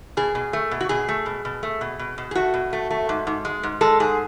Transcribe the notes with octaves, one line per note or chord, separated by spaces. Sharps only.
B2 G#4
B2
A3
B2
F#4
B2 G#4
A3
B2
B2
A3
B2
B2
B2
G#4
A3 F#4
B2
A3
A3
G#2
G#2
G#3
G#2
G#3 A4
G#2 G#4